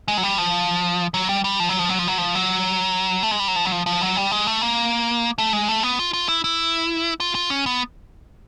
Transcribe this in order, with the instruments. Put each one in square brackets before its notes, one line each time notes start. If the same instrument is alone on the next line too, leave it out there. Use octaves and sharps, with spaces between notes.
[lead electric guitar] G#3
F#3
G3
F3
F#3
G3
G3
F3
F#3
F3
F#3
F3
F#3
F3
F#3
A3
G#3
G3
F#3
F3
F#3
F3
F3
F#3
G3
G#3
A3
A#3
A3
G#3
A3
B3
F4
F4
E4
E4
F4
F4
C#4
B3